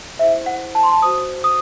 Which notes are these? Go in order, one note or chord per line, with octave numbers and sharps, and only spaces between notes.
E4 G#4 C5 E5
F#5
A5
C6
A5
F#4 C5 D#6
D#6